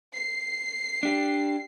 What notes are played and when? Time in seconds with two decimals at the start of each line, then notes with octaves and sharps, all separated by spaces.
0.14 C7
1.03 D4 G4